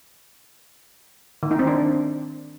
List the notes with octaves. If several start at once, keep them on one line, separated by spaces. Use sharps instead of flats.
D#3
D#4
C4
D4